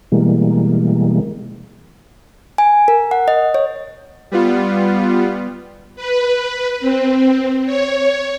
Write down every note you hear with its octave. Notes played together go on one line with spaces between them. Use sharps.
B2 E3 G3 G#3 A#3
G#5
A#4
F#5
D#5
C#5
G3 B3 F4
B4
C4
C#5